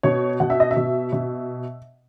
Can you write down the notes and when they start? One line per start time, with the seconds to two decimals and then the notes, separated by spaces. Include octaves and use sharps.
0.03 B2 C#5
0.40 B2 F#5
0.50 E5
0.60 D#5
0.71 E5
0.76 B2
1.12 B2